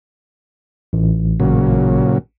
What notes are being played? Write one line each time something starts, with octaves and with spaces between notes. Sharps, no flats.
A1
A#2 C#3 F#3